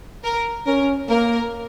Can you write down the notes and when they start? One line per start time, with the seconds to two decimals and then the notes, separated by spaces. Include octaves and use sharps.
0.24 A#4
0.66 C#4 A#4
1.09 A#3 A#4